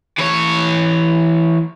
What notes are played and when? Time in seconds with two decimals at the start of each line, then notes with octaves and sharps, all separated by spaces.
0.19 E3 C#5